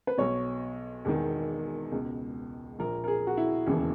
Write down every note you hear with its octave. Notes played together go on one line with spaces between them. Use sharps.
B4
B1 B2 C#5
E1 E2 D#3
C#2 B2
A#1 A#2 A#4
A#4
G#4
F#4
E4
E1 D#2 C#3 E3